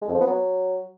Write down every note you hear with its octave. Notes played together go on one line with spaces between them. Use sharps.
G#3
F2
F3
B3
F#3